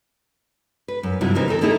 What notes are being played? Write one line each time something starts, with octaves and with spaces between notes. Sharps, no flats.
B4
F#2
G2 C3 F#3 E4 F4
C3 E3 C4 D#4 A#4 B4
D#3 D#4 A4 A#4
A3 A#3 D#4 E4 G#4